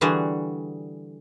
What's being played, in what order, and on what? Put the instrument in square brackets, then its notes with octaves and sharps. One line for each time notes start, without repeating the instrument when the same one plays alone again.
[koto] D3 E3 G3 F#4 G#4